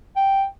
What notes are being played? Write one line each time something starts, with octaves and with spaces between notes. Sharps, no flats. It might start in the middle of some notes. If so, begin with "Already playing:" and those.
G5